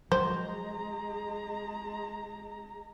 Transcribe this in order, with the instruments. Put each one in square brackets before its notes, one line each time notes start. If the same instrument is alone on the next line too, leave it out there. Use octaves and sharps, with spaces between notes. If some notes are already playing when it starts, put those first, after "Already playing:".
[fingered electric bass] F3 F#3 [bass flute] G#3 [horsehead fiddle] G#4 A#5 [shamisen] C5